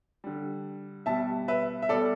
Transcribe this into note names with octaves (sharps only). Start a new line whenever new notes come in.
D3 G3
B2 G3 E5 A5
B4 E5
E5
B2 G3 A4 D5